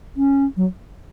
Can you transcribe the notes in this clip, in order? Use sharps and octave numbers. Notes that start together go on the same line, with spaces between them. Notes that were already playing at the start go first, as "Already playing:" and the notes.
C#4
F#3